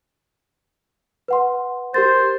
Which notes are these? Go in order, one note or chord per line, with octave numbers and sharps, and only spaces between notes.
B4 F#5 C6
G4 A#4 C5 A6